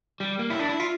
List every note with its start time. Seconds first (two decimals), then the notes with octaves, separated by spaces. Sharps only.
0.20 G3
0.39 A#3
0.50 E4
0.59 D4
0.69 E4
0.80 F4